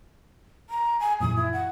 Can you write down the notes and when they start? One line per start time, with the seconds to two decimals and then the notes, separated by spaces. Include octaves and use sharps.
0.70 A#5
1.00 G#5
1.21 F#2 A#2 E3 D#6
1.36 E4
1.53 F#5